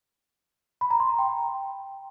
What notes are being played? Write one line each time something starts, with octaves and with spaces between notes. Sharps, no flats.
B5
A#5
C6
A#5
G5